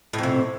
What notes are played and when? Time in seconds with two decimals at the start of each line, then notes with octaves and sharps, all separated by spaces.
0.13 A2
0.18 F2
0.23 C3